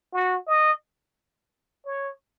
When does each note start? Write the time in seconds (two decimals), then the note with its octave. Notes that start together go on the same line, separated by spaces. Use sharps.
0.13 F#4
0.47 D#5
1.86 C#5